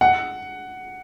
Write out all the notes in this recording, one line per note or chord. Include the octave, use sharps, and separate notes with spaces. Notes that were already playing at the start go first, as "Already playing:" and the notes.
F#5